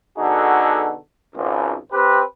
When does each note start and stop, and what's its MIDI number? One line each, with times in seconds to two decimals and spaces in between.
0.18 0.95 47
0.18 0.95 50
0.18 0.95 63
0.18 0.95 66
0.18 0.95 68
0.18 0.95 69
1.36 1.75 32
1.36 1.75 37
1.92 2.22 60
1.92 2.22 67
1.92 2.22 71